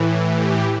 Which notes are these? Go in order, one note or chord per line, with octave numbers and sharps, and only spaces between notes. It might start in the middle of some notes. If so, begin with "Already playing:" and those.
Already playing: A2 E3
G4